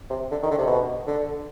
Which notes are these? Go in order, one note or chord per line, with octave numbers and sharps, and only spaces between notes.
C3
D3
D#3
D3
C3
B2
D3